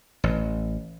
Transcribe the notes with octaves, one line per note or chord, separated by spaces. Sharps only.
A1